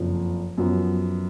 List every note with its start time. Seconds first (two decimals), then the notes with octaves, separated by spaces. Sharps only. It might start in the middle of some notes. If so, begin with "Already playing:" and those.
Already playing: F#1 F2 F3
0.58 F#2 F3 B3